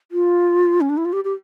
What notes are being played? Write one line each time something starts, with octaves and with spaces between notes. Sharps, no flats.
F4
C#4
D4
E4
F4
G4
G4